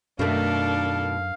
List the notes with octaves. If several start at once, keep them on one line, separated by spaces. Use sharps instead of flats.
F#2 B2 D#3 A3 D4 A4 A#4 F5